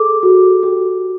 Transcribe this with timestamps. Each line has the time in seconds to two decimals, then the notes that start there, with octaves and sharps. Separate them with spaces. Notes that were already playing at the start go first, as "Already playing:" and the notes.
Already playing: G#4 A4 D6
0.23 F#4
0.63 G4